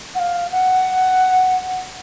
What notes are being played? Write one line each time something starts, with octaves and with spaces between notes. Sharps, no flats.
F#5
F5
F#5